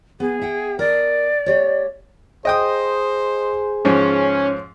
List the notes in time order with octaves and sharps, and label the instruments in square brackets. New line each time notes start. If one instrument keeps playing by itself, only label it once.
[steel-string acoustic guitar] B3 [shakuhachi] G#4
[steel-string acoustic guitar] E5 F#5 G5
[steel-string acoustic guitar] A#4 D#5 [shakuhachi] D5
[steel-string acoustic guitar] A3 G4 C#5
[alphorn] G#4 [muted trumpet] C5 [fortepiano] D#5 G5 D#6
[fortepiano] G#2 F3 [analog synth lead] C#4